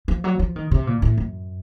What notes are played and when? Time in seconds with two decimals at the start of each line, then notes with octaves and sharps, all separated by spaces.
0.08 F3
0.24 F#3
0.39 F3
0.56 D#3
0.71 C3
0.87 A#2
1.02 A2
1.18 F#2